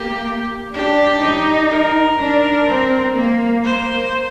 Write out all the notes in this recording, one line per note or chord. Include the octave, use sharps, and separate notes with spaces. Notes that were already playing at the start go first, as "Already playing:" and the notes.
Already playing: A#3 G4
D4 G4
D#4
A#4
D4
C4
A#3
A#3 C5